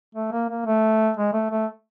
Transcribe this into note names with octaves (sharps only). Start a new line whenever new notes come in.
A3
A#3
A#3
A3
G#3
A3
A3